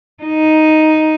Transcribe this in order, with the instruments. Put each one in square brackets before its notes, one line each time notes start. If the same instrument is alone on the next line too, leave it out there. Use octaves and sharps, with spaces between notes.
[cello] D#4